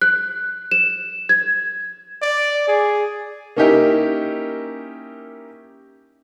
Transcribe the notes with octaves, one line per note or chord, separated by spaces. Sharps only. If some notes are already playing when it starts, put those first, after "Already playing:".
F#6
E7
G#6
D5
G#4
A#3 C#4 D#4 E4 G4 A#4